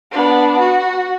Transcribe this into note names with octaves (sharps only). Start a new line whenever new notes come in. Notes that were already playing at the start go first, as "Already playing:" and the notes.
B3 D4
F#4